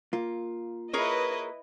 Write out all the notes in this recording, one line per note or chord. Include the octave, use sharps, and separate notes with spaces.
A#3 F4
E4 G#4 A#4 B4 C#5 D#5